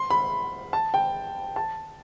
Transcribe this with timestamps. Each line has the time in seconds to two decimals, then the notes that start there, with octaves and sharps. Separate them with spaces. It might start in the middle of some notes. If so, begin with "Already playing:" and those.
Already playing: C6
0.10 B5
0.73 A5
0.94 G5
1.56 A5